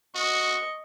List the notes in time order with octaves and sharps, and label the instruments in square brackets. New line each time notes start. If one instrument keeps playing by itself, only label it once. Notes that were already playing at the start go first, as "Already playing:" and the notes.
[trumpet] F#4 [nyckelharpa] D#5 C#6